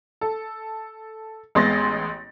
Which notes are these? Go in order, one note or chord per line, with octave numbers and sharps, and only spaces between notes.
A4
A1 G#3 B3 C6 A6 A#6